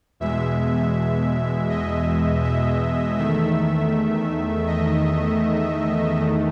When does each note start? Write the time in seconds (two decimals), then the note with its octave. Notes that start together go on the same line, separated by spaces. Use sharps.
0.20 E2 B2 G#3 E5
1.69 D#5
2.44 E5
3.18 E2 D#3 A3 E5
4.67 D#5
6.16 E2 D#3 A3